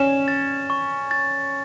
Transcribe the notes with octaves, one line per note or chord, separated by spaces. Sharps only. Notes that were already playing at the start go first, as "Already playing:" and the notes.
Already playing: C#4 E7
A6
C#6
A6